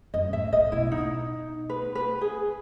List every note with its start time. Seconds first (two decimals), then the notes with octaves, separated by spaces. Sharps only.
0.14 F#2 D#5
0.33 A2 E5
0.52 A2 D#5
0.72 B2 E4
0.92 D#4
1.70 B4
1.95 B4
2.21 G#4